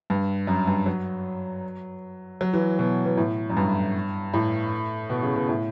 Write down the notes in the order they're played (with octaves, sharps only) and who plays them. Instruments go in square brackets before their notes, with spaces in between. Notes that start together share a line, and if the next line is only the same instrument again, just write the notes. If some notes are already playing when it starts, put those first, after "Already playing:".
[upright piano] G2
F#2
G2
F#3
F#3
E3
B2
B2
A2
F#2
G2
A2
B2
C#3
B2
A2